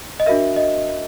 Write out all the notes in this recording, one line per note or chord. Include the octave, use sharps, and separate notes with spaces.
D#5
D4 F#4 A#4 E5
D#5